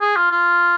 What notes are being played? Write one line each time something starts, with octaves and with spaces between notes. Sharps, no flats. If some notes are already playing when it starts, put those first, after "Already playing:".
G#4
F4
F4